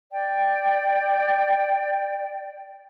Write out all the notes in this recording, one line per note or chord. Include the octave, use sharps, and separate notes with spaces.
D5 G5